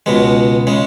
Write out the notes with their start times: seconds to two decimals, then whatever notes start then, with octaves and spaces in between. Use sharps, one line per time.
0.06 C#2 B2 G#3
0.67 C#3 G#3